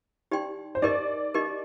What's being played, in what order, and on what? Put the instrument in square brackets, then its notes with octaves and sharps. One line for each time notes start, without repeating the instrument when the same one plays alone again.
[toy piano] D#4 G4 D5 G5 C6
[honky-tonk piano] C5
[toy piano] D#4 G4 A#4 D#5 [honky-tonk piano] D5
[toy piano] D#4 G4 A#4 D#5